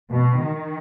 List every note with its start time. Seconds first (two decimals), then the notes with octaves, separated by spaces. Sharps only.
0.11 B2
0.42 D#3